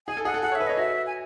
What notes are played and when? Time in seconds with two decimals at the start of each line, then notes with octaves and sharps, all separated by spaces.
0.07 G#4 G#5
0.17 A4
0.25 G#4 F#5
0.34 A4
0.42 G#4 F#5
0.52 C#5
0.55 E5
0.60 B4
0.67 C#5 D#5
0.77 F#4 E5
1.07 G#5